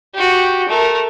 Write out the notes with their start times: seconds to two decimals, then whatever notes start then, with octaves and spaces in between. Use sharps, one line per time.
0.14 F#4 G4
0.69 A3 A#4